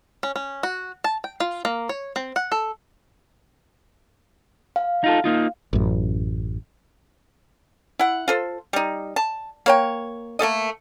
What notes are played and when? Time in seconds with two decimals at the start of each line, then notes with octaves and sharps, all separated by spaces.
0.23 C#4
0.36 C#4
0.63 F#4
1.04 A5
1.24 G5
1.40 F4
1.65 A#3
1.89 C#5
2.16 C4
2.36 F#5
2.52 A4
4.76 F5
5.04 D#4 F4 A4
5.24 A#3 D#4 F4
5.73 A1 F#2
7.99 E4 F#5
8.28 F4 A4 C5
8.73 G3 D#4
9.16 A5
9.66 A#3 C#5 G5
10.39 A3 A#3 A4 D#5